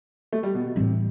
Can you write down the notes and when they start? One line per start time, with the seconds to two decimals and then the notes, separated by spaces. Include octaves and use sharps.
0.32 A3
0.43 G3
0.54 B2
0.65 B2
0.76 A2 C3 E3 G3 D4